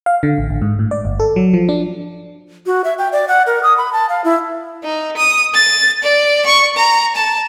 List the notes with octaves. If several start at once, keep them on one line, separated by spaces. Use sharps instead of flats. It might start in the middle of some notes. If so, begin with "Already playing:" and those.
F5
D3
A1
A1
G#2
A2
D5
G1
A4
F#3
F3
D4
F#4
E5
G5
D5
F#5
A#4
D#6
B5
A5
F5
E4
D#4
D#6
A6
D5
C#6
A#5
A5